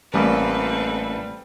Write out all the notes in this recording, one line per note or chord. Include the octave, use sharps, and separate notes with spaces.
A1 G3 A#3 C4 A4 B4